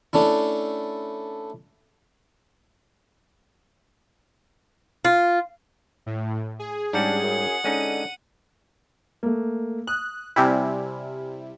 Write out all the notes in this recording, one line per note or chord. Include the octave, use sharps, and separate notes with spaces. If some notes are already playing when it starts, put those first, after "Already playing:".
A3 C#4 D4 E4
F4
A2
G#4
G#2 G3 C#4 D4 F#5
F#2
D3 G#3 C#4 D#4 D#7
A3 A#3
D#6 F#6
C3 G3 E4 G#5 F6